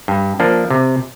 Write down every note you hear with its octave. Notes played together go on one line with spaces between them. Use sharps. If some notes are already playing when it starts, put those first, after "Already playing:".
G2
F3 A#3 D4
C3